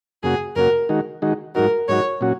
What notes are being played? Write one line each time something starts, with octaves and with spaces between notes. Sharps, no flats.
F#2 C#3 A#3 F#4 G#4
F#2 C#3 A#3 F#4 A#4
D#3 G#3 D#4 F#4
D#3 G#3 D#4 F#4
G#2 F#3 D#4 F#4 A#4
G#2 F#3 D#4 F#4 C#5
A#2 F#3 C#4 F#4